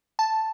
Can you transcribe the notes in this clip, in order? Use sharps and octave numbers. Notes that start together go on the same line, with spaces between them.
A5